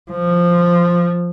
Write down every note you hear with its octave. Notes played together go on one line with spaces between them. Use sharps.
F3